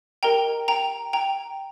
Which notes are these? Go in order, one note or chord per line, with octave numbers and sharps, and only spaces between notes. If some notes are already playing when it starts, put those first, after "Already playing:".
G4 A#4 D#5 G5 A#5
G5 A#5
G5 A#5